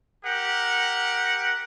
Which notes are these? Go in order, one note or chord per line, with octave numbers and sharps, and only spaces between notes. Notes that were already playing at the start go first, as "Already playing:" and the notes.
G4 A#4 F#5